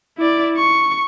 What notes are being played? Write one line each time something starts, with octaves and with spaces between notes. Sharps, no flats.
E4 D5
C#6